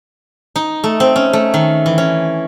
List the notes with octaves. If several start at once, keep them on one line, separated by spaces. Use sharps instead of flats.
D#4
A3
C4
C#4
A3
D#3
E3
C#4